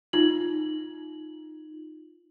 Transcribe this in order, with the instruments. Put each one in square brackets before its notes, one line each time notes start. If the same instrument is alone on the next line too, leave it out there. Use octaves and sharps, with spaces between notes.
[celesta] D#4 F4 F#7